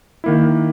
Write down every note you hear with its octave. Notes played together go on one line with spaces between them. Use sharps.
D#3 A#3 E4